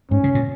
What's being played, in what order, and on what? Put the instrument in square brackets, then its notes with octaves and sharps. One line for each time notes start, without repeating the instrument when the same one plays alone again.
[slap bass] G#2 [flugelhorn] C#4
[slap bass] C#3
A#2